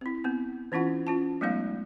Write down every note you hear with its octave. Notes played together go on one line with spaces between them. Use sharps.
C4 E4
B3 C4
E3 C#4 E4 F4 F#5
C#4 F4 A5
F#3 G#3 A3 B3 D#4 F5